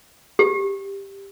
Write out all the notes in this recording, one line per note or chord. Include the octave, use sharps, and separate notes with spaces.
G4